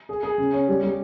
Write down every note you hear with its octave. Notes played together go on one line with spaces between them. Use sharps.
G#4
G#4
C#3
C#4
G3
G3